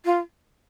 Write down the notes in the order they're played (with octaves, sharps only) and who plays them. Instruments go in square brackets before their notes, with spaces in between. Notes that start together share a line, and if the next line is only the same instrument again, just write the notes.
[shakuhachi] F4